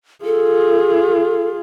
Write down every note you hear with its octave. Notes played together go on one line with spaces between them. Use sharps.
F4 G#4 A4